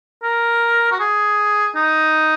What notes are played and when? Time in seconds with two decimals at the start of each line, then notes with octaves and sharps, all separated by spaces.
0.23 A#4
0.92 F#4
1.00 G#4
1.76 D#4